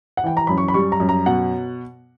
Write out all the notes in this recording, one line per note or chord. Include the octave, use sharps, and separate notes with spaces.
F#5
E3 G5
A#5
F#2 B5
C#6
B5
G3 C#6
A#5
F#2
A#5
B2 F#5